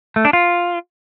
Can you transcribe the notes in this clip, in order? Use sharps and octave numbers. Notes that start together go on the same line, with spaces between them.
A3
D4
F4